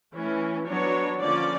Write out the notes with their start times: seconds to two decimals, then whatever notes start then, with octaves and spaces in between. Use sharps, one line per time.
0.15 E3 A3 C#4
0.67 F#3 B3 D4 C#5
1.20 D3 F3 A#3 C#4 D5